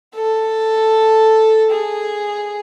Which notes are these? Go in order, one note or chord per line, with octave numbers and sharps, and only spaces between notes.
A4
G#4